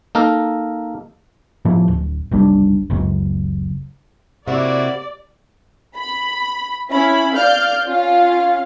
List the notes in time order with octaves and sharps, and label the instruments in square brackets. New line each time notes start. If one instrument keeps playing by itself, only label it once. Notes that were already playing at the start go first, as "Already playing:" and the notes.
[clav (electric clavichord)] A#3 D#4 A4 A#4
[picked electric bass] A2 F3
D1
F#1 C2 G3 D4
F#1 C#2 F#2
[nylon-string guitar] C3 [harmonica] A#3 E4 F#4 [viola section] D5
[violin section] B5
C#4 E4 B5
D5 F5 F6 G6
C#4 F4 F5